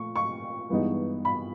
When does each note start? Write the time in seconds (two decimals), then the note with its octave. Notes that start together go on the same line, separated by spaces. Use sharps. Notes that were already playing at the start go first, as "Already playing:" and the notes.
Already playing: A#2 F3 A3 C#6
0.16 C#6
0.70 G2 E3 G#3 B3 D#4
1.25 B5